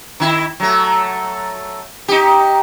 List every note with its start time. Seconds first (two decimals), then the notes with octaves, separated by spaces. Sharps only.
0.20 D#3 E4
0.60 F#3 A3
2.08 D#4 G4